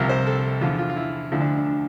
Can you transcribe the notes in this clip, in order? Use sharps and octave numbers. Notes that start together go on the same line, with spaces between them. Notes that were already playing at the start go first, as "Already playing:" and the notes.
Already playing: C2 C3 F3 A#4
C5
A4
E2 D3 F3 F4
F4
F4
E4
D2 D3 F3 E4
D4
D4